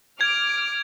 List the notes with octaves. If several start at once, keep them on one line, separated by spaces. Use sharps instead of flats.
D6 F6 G#6 D7